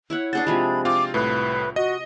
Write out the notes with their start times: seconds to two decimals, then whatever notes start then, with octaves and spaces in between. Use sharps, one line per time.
0.10 E4 C#5 F#5
0.33 D4 G#4 C5 F#5 A6
0.47 C3 F3 G#3 B5
0.85 C4 F4 F5 D6
1.14 C2 A2 B4
1.76 F#4 D#5